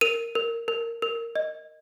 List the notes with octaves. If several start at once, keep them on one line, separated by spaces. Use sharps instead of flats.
A#4 D#7
A#4
A#4
A#4
D#5